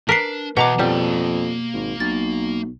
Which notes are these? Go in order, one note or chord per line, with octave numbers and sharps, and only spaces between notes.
D4 A#4 B4 B6 C7
E2 B2 F#5 A#5 D6
F2 G3 A#3 A5
G#1
B1 A6